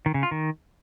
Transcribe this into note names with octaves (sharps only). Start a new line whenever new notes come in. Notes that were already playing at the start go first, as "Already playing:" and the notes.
D#3
C#3
F4
D#3